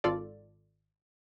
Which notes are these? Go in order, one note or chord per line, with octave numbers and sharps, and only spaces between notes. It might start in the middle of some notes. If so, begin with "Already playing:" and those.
G#1 F4 A4 D5